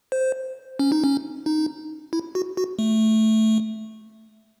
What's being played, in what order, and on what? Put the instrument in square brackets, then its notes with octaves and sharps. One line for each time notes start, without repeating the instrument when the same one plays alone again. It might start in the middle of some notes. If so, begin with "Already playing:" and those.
[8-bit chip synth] C5
C#4
D#4
C#4
D#4
E4
F#4
F#4
A3